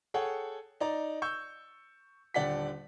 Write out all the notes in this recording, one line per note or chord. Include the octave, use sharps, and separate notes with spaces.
G#4 A4 C#5 F#5 G5
D#4 D5 A#5
C#6 E6 G6
D#1 D3 D5 F#5 G5 B6